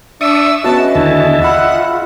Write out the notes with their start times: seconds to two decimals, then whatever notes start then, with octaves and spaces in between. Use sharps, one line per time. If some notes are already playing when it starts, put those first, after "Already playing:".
0.21 D4 D5 E5 C#6 D#6
0.64 B3 C#4 F#4 G#4 D#5 E5 A5
0.95 D#2 D3 E4 A5
1.42 F4 F#5 B5 E6